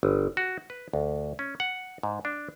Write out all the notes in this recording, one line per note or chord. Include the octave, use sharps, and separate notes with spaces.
G1
F#4
B4
D2
C#4
F#5
G#2
D4